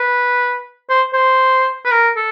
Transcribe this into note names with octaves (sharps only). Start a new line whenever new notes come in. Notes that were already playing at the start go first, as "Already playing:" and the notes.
Already playing: B4
C5
C5
B4
A#4
A4